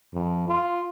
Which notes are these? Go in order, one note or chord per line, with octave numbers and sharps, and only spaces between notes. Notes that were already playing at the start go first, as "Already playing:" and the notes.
F2
F4